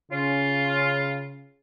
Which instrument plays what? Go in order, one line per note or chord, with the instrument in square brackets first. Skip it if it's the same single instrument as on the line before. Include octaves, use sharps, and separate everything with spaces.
[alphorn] C#3 [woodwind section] C#4 F4